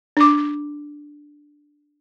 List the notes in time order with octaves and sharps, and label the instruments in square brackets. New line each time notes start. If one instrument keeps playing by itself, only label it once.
[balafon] D4 D6